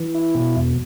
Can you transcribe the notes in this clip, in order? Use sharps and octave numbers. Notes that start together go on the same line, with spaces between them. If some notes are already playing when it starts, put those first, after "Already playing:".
Already playing: E3
E4
B2
E2